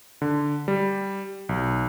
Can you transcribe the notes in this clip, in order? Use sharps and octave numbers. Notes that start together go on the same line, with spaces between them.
D3
G3
B1